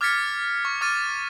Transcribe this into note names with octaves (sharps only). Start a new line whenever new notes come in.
D6 F6 G#6 A6 B6 C#7
C#6
C#6 D6 F6 A6 D#7